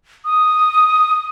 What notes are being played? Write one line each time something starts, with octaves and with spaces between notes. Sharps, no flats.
D#6